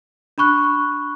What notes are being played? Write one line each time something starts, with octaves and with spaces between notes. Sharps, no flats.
D4 B5 C#6 F#6